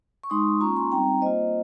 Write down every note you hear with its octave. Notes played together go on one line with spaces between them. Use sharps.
C#6
G#3 D#4 C6 D#6
A#3 C#4 F4 A#5 C#6
G#5 C6
G3 C4 D#4 G5 A#5
A#3 F4 C5 D#5